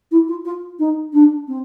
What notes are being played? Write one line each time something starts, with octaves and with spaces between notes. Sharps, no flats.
E4
F4
F4
D#4
D4
C4